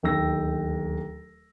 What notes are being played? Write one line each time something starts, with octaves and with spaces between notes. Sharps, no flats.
D1 D#2 G5 E6 A#6